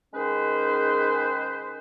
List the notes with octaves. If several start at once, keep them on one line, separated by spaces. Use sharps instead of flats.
D#3 G#3 C#4 G#4 B4 C5